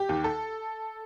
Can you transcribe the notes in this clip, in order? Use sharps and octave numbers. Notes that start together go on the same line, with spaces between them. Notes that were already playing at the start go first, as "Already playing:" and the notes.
Already playing: G4
D#2 D#3
A4